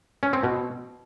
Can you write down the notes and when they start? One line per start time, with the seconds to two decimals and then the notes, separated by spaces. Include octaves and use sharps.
0.23 C#4
0.33 C4
0.43 B2